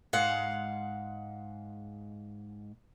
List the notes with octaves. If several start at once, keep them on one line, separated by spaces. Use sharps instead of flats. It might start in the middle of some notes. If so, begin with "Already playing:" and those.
G#2 G#3 F5 F#5